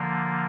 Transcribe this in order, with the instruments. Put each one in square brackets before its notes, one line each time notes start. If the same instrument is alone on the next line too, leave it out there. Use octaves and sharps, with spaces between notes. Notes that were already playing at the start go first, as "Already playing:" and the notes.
Already playing: [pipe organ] D3 F3 A#3